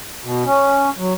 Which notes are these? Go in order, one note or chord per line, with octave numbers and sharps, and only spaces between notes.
B2
C#4
F#3